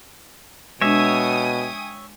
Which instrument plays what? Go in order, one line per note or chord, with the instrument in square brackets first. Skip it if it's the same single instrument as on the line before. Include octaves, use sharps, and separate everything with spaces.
[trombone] B2 [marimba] G#3 D4 [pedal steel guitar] C#5 E5 [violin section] G5 G#5 D#6